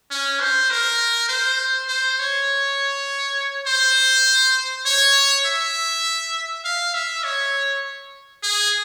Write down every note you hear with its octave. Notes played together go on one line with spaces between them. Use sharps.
C#4
C5
A#4
C5
C5
C#5
C5
C#5
E5
F5
E5
C#5
G#4